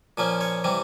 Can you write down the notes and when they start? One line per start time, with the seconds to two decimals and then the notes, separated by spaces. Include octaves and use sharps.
0.18 A#2 F3 A#3 C#4
0.41 C#5
0.64 C3 E3 G3 C4